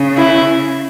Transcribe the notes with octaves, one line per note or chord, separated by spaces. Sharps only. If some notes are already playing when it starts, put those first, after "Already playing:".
Already playing: C#3
E4